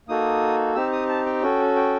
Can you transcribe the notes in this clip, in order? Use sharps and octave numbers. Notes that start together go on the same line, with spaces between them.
A#3 D#4 F#4 A4 D#6
C4 D#4 G4 E6
D#6
A5
G5
C#4 F#4 A4
G5